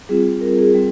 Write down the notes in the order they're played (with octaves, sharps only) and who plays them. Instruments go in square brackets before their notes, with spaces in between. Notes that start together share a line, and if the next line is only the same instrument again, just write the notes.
[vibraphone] G3 C4 F4 G#4
A#4
G#4
G3 C4